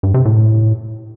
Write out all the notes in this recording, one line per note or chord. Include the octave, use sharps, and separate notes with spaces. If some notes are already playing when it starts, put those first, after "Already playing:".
G2
C3
A2